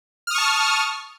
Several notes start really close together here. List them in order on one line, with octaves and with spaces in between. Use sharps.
F6 D#6 C#6 A5